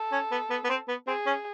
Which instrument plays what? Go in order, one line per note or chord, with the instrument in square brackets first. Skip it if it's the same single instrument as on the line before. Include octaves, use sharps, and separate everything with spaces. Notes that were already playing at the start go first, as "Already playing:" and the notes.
Already playing: [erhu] A4
[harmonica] C#4
B3
B3
B3
C4
B3
[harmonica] C4 [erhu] G#4
[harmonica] C#4